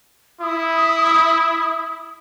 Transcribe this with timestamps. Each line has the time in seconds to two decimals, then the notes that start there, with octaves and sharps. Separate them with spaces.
0.41 E4 D#6